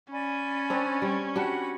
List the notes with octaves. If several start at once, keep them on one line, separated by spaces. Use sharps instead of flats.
C#4 D5 G#5 B5
C4 D4
G3
D4 F#4 G4 F#5 B5